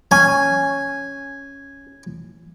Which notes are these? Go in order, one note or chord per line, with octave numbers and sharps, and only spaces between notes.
C#4 G#5